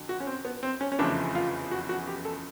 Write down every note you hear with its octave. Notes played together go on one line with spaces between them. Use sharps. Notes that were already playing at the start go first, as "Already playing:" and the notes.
Already playing: F2 D3 F#3
F#4
C#4
C4
B3
C4
C#4
C#4
F1 E2 C#3 F3 A3 D4
F4
F#4
F#4
G4
A4